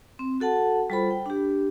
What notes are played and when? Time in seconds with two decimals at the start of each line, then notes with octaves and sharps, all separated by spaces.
0.19 C4
0.40 F#4 A4 F#5 A5
0.90 G3 F4 A4 C5 B5
1.11 G5
1.26 D4 G4